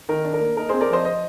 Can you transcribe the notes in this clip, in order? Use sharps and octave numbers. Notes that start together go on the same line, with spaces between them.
D#3 A#4
D4
A#4
A#3
D#4 A#4
C4 G#4 C5
A#4 D5
F3 C5 D#5
F3 C5 D#5